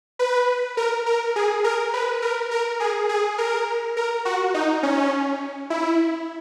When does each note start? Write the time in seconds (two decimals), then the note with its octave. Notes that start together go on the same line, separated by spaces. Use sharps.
0.19 B4
0.77 A#4
1.06 A#4
1.36 G#4
1.64 A#4
1.94 B4
2.22 A#4
2.51 A#4
2.80 G#4
3.09 G#4
3.38 A#4
3.97 A#4
4.25 F#4
4.54 D#4
4.83 C#4
5.70 E4